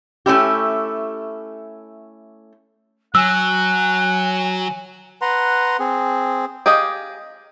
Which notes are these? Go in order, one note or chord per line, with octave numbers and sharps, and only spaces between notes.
A3 C#4 E4 G4
F#3 F#5 G#5 E6
B4 F#5 A#5 C6
C4 G#4
G4 G#4 D#5 F5